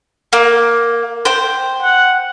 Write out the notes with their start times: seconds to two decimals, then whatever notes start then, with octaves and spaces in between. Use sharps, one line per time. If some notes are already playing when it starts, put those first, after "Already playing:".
0.33 A#3
1.25 C5 G5
1.83 F#5